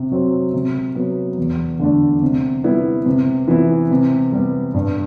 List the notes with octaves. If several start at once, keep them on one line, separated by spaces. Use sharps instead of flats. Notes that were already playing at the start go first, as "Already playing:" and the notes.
Already playing: C3
F#3 C4
C3
F#3 B3
E2
D3 A3 D4
C3
G3 B3 E4
C3
E3 B3 E4
C3
G3 B3
G2